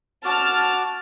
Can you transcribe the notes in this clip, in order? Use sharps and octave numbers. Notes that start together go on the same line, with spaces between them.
F#4 A5 D6 F6